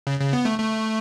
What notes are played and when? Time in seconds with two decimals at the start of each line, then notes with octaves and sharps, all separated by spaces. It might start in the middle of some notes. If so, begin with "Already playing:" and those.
0.07 C#3
0.20 C#3
0.33 B3
0.45 A3
0.59 A3